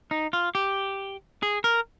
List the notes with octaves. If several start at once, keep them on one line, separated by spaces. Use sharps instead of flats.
D#4
F4
G4
G#4
A#4